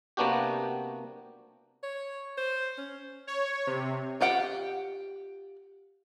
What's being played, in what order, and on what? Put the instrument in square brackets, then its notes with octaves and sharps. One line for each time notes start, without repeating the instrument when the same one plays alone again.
[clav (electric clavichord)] C3 A#3 B3 D4 F#4 G4
[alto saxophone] C#5
C5
C#4
[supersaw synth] C#5
C3
[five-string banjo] F4 G4 F#5 G5